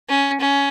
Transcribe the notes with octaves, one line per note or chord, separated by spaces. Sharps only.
C#4
C#4